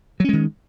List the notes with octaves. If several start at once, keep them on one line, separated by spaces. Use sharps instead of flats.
D#3 F#3 G#3 C#4